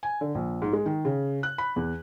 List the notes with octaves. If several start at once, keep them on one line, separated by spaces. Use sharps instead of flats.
G#5
D3
A#1
G#2
G#3
D#3
C#3
F#6
B5
E2